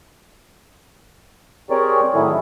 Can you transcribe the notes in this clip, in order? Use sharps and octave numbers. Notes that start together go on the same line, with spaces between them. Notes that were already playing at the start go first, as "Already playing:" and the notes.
C4 G4 G#4 A#4 C#5 D5
A2 D#3 F#3 E4 G#4 A4